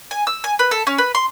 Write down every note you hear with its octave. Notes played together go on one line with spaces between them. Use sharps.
G#5
E6
G#5
B4
A4
C#4
B4
C6